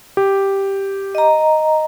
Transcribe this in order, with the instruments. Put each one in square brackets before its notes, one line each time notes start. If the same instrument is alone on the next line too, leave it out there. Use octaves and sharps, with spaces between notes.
[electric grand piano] G4
[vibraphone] D#5 A#5